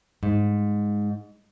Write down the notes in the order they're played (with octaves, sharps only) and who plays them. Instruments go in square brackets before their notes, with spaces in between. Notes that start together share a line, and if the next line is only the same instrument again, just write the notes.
[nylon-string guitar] G#2